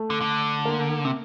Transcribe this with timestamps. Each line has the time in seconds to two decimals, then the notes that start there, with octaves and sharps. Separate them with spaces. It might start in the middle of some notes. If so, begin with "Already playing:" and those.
Already playing: A3
0.10 D3
0.21 D3
0.65 A#3
1.05 C3